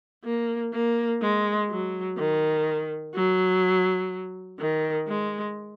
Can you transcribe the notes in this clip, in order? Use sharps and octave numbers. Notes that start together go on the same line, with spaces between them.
A#3
A#3
G#3
F#3
D#3
F#3
D#3
G#3